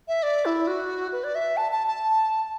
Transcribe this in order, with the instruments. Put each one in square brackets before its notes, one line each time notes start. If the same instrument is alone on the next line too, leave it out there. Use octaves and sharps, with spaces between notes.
[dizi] E5
D5
E4
F#4
B4
D5
E5
A5
A5
A5